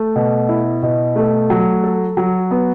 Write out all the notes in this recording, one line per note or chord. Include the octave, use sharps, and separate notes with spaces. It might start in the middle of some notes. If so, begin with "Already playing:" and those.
Already playing: A3
B2
E4
B2
A3
F#3
A4
F#3
B3